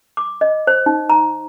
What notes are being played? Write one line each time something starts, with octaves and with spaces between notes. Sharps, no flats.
D6
D#5
C5
D#4
A#5